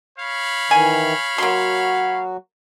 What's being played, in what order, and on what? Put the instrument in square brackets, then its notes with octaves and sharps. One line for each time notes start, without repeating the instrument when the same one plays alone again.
[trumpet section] C#5 F5 B5
[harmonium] D#3 E3 [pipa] G#5
[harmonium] F#3 F#4 [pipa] A#3 C6